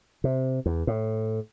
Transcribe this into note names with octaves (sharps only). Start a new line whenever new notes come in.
C3
E2
A2